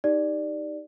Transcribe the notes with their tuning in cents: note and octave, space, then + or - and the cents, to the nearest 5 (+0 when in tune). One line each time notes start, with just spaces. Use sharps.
D#4 +0 G4 +0 D5 +10